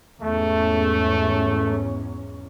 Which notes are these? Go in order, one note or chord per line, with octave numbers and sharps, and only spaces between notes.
E2 G#2 A3 C#4